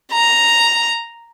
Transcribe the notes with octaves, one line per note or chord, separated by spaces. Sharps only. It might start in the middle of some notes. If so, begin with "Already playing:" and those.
A#5